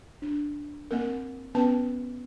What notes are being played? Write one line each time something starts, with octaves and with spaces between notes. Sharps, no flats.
D4
A#3 C4 A#4
B3 C#4 B4 A5